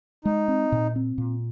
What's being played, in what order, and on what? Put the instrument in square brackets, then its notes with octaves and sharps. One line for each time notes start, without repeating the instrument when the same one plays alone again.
[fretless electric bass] G#3 [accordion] D#4
[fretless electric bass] C4
A#2
C4
A#2